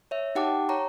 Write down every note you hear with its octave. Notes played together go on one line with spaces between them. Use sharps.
C#5 E5
D#4 G4 F#5 G5 A5 D6
C#5 A#5 C#6